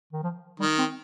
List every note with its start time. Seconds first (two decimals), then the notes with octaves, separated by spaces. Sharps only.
0.13 D#3
0.23 F3
0.59 D#3 G3
0.78 C4